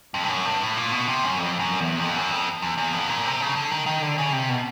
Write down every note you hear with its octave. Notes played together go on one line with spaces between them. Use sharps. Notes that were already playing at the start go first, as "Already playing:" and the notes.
F2
G2
F#2
G2
A2
A#2
B2
C3
F#2
F2
F#2
E2
F2
F#2
F2
E2
E2
F2
A#2
C3
C#3
D3
D#3
D#3
D3
C#3
C3
B2